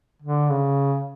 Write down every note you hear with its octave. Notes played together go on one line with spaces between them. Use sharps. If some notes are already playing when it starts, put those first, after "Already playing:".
D3
C#3